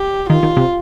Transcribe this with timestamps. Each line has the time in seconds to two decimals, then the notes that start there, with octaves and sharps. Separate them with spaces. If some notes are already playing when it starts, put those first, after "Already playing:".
Already playing: G4
0.29 D#3 F4
0.43 D#3
0.57 C3